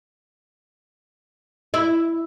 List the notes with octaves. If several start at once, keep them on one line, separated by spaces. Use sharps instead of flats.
E4